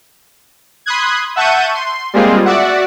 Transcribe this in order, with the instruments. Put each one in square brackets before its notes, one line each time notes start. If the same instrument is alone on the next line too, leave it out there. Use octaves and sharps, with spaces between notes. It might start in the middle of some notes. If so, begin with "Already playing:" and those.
[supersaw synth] B5 C6 D#6 F#6 G#6
E5 F#5 A5 C#6 G6 D#7
C6
G3 G#3 A#3 C4 F4 G#4
F#4 D5 E5 F#5